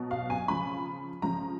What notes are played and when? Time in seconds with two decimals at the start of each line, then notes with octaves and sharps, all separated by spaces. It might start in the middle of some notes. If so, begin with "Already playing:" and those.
Already playing: B2 F#3
0.11 F5
0.30 G#5
0.48 C#3 F3 B5
1.22 C#3 F3 A#5